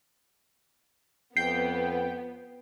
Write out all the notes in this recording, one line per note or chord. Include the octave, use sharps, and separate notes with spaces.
F2 B3 G5 C7